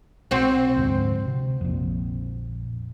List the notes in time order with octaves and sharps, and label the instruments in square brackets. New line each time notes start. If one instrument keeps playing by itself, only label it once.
[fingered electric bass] B1 [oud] C4 F#4
[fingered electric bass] D2 G#2
C3
A#1 F2